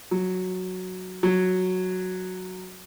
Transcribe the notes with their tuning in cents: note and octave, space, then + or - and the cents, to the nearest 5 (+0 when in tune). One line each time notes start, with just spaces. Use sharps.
F#3 -5
F#3 -5